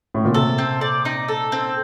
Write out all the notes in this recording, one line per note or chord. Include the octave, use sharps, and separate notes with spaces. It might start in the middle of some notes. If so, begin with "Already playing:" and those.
A2
A#2
C3 A4
C4
D5
D#4
A4
C4